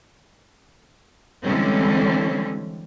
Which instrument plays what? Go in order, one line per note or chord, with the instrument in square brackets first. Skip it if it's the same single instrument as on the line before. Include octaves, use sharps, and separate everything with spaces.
[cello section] D3 E3 G3 G#3 C4 C#4